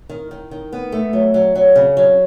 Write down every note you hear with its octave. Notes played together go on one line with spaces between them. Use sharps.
D#3
D#3
D#3
B3
A3
F#3
F#3
F#3
C#3
F#3